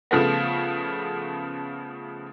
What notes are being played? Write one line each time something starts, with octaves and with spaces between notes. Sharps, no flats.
C#3 F3 A3 B3